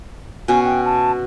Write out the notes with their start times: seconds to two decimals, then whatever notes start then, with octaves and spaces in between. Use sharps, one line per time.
0.48 B2 C#4 G#5
0.65 G5
0.85 A5